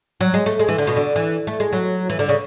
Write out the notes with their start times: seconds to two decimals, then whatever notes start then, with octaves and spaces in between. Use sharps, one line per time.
0.21 F#3
0.34 G#3
0.46 A3
0.59 G#3
0.68 E3
0.78 D3
0.87 B2
0.96 D3
1.16 E3
1.47 A3
1.60 G#3
1.73 F#3
2.10 E3
2.19 D3
2.29 C#3